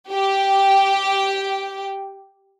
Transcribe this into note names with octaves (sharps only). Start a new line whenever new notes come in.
G4 G5